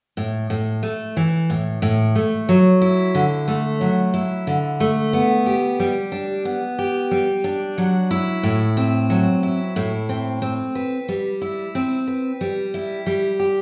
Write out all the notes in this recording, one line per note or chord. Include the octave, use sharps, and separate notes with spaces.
A2
A2
A3
E3
A2
A2
A3
F#3
E4
D3
A3
F#3
E4
D3
A3
B3
G4
G3
D4
B3
G4
G3
D4
F#3
E4
A2
C4
F#3
E4
A2
C4
C4
B4
G3
E4
C4
B4
G3
E4
G3
G4